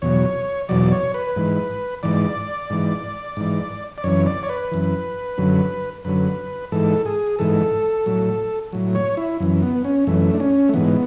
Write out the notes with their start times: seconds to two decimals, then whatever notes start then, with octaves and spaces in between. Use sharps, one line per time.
0.02 E2 B2 F#3 C#5
0.69 E2 B2 F#3 D5
0.92 C#5
1.14 B4
1.37 G#2 E3
2.03 G#2 E3 D5
2.70 G#2 E3
3.37 G#2 E3
3.98 D5
4.04 F#2 E3 C#5
4.26 D5
4.43 C#5
4.49 B4
4.72 F#2 E3
5.38 F#2 D3 F#3
6.05 F#2 D3 F#3 B4
6.72 G#2 E3 A4
7.06 G#4
7.39 G#2 E3 A4
8.06 A2 F#3
8.73 A2 F#3
8.95 C#5
9.17 E4
9.40 F#2 E3
9.62 B3
9.84 C#4
10.07 F#2 E3 A3
10.34 D4
10.40 C#4
10.69 A3
10.74 G#2 E3 B3